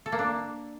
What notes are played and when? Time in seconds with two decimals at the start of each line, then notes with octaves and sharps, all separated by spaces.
0.06 A4
0.12 A#3
0.19 D4